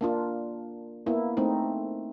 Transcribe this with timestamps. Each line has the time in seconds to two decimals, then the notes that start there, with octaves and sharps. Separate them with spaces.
0.01 A#3 D4 F4
1.06 A#3 B3 E4
1.37 A3 C4 D#4